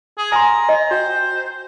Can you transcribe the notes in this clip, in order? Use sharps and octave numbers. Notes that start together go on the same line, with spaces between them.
G#4
G#5 A#5 C6
D#5
F#4 C5 G5